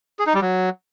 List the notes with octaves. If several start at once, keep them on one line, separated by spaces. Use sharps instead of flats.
G#4
D#4
G3
F#3